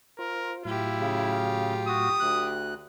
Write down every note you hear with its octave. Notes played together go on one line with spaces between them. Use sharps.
F4 A#4 C5
A2 F#3 E4 F4 G4 F5
C#3
F#4 D#6
D2 F#6